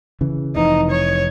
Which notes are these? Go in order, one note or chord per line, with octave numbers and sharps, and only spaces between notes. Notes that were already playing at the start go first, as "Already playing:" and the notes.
C#3 E3
F1 E3 C4 D#4
C#5